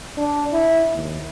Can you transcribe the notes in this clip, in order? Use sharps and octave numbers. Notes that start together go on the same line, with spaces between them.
D4
E4
D#2